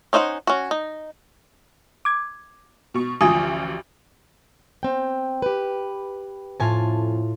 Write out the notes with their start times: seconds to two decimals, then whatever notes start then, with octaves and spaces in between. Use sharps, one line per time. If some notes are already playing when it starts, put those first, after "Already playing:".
0.13 C#4 D#4 C5 F5 F#5
0.47 C#4 F#4
0.71 D#4
2.05 D6 G#6
2.94 B2 C#6
3.21 A1 D2 F3 G#5 D#6
4.83 C4 G5
5.42 G4 B4
6.60 F2 A2 F4 G#5 A5